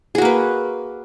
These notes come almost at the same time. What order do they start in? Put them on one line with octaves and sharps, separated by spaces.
G#4 F#4 A#3 B4